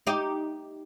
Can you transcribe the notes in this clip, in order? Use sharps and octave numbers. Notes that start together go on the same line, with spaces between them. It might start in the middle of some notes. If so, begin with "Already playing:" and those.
D#4 G4